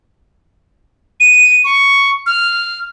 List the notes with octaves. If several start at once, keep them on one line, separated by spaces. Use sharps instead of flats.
D#7
C#6
F6